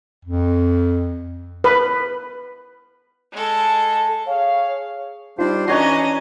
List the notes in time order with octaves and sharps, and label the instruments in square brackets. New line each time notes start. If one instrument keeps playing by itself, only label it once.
[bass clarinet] F2
[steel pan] B4
[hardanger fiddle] G#3 A4
[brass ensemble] G#4 C#5 F5
[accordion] G3 D4 C5 [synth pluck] D#4 F4
[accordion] E3 D4 [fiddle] C#4 D#5 [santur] F#4 C#5 A#5 [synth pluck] C7